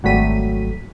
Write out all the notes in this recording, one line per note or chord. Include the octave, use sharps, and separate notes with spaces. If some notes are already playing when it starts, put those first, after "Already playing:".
G#1 F#3 G3 A3 B6 D#7